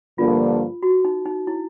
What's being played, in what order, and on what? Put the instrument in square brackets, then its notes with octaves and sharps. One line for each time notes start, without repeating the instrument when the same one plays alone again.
[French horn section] G2 D3 F3 A#3 [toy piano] F4
[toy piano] F#4
D#4
D#4
E4